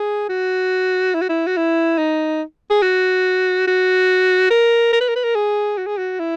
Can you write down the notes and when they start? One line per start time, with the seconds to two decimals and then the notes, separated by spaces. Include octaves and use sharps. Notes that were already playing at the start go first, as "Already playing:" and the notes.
Already playing: G#4
0.29 F#4
1.14 E4
1.21 F#4
1.29 E4
1.46 F#4
1.57 E4
1.98 D#4
2.70 G#4
2.82 F#4
3.67 F#4
4.51 A#4
4.93 A#4
5.01 B4
5.08 A#4
5.16 B4
5.24 A#4
5.35 G#4
5.78 F#4
5.87 G#4
5.97 F#4
6.19 E4